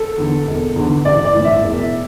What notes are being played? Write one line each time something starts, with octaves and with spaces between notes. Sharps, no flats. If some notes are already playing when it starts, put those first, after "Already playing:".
Already playing: A4
E2 D3
E1
E2 D3
A1 D5
D5
A2 E3
E5
E1